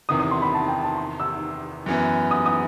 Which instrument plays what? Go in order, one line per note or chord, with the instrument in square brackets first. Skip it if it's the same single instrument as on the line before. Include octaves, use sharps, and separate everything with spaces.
[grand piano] E2 C3 D#3 [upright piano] D#6
[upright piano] D#6
C6
B5
A5
G5
A5
C6
E6
[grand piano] F#2 E3 B3
[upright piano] D#6
D#6